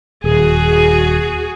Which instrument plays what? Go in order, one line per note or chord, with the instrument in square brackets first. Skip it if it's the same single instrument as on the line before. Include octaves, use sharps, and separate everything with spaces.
[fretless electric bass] D#1 [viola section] F#4 G#4